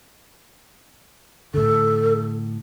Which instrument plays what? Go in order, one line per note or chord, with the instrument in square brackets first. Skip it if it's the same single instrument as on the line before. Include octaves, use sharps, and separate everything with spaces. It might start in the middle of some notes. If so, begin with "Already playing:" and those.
[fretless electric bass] A2 D3 [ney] A4